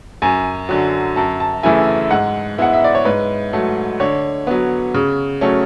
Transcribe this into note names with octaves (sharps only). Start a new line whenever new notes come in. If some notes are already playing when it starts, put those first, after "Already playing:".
F#2 G#5
D3 F#3
F#2 A5
A5
C#3 E3 A3 E4 G#5
G#2 F#5
G#3 B3 E4 F#5
E5
D5
C#5
G#2 B4
F#3 A3
D3 C#5
F#3 B3
C#3
F#3 A3 C#4